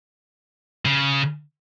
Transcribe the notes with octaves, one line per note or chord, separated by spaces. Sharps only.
C#3